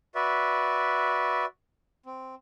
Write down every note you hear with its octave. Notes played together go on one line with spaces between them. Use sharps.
F#4 B4 D5 E5
C4